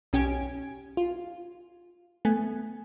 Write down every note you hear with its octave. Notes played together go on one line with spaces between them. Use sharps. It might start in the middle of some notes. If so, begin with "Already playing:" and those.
B1 C#4 G4 G#5 G#6 D7
F4
A3 B3 G#5